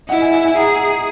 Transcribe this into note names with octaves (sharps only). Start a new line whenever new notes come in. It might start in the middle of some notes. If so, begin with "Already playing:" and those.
E4 D#5 F#5
E5 G#5
E5 G#5
E5 G#5
G#4 F#5 A#5